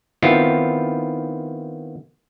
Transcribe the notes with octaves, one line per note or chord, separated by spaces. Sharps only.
D#3 B3 C4 E4 F4